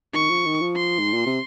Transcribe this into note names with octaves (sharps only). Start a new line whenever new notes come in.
D#3 C#6
F3
D#3
F3
C6
G#2
A#2
C3